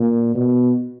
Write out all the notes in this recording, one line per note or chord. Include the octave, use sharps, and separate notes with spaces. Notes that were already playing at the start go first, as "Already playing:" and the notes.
Already playing: A#2
B2